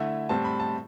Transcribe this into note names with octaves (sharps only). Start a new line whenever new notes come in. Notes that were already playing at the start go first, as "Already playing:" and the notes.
Already playing: D3 A3 E4 E5
A2 G3 C4 A5
B5
A5